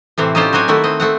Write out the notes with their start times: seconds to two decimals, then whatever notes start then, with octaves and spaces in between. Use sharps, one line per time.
0.18 A2 C3 E3 C4
0.35 C#4 D#4 F4 G4 A4 C5
0.53 F#3 C4 F#4 G4 G#5
0.68 D#3 A3 E4 F#4 A4
0.84 C4 D#5
1.00 A3 C4 F#5